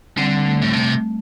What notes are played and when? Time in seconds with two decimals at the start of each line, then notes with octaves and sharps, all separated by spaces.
0.17 D3 G3 C4
0.46 A3
0.62 A2
0.73 C3 A3